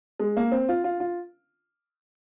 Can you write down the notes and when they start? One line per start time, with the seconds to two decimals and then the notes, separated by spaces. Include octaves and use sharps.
0.20 G#3
0.37 A#3
0.52 C4
0.69 F4
0.84 F4
1.00 F4